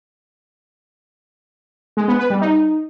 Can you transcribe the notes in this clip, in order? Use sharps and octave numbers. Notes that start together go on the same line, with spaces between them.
G#3
B3
B4
G3
D#4